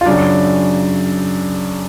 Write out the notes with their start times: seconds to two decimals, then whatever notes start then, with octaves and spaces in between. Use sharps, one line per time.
0.01 F4
0.06 F#2 C#3 F#3 D4